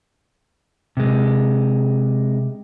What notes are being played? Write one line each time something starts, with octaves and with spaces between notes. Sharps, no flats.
C3 G#3